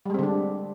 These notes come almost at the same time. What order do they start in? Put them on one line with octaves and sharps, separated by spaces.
G3 G#3 C4 D3 D4